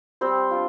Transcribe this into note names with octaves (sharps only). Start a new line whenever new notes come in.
G3 C4 C5
D4 F4